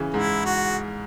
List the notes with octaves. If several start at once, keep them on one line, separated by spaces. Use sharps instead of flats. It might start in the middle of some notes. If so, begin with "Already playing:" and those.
Already playing: C#3 E3
G#2 E4
F#4